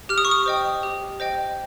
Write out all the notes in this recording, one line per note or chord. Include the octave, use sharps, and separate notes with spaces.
G4 F6
D#6
C#6
D#6
C5 D#5 G5
G4
C5 D#5 G5